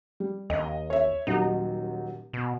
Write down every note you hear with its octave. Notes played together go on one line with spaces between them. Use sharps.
G3
D#2 D#5
C#5 E5
D#1 D#2 F#3 D#4
B2